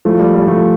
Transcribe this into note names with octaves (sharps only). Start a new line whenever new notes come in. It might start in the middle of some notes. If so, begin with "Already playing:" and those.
F3 A3
G3
G3
F3 A3